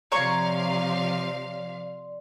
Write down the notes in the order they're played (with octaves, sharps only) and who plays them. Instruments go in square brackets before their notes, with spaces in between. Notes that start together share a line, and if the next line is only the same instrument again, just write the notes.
[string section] C3 F3 F5 [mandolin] C#5 A#5 C#6 [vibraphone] D5 C6